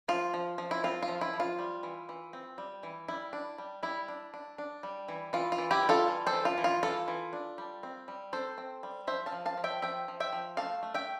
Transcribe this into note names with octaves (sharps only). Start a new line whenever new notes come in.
F3 F4
F3
F3
E4
C4 F4
F4
F3
E4
F3
F4
G3
E3
E3
C4
G3
E3
G3 E4
D4
G3
G3 E4
D4
D4
D4
G3
E3
E3 F4
F4
E3
E4 G4
G3
F4 A4
E3
A4 C5
E3
F4
E3
F4
E3 F4 A4
E3
D4
G3
C4
G3
C4 A4 C5
C4
G3
F3 C5 E5
F5 A5
F3
F5 A5
F3
E5 G5
F3 E5 G5
F3
E5 G5
F3
A3 F5 A5
A3
E5 G5